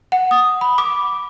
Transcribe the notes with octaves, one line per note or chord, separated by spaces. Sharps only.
F#5
D#6
B5
D6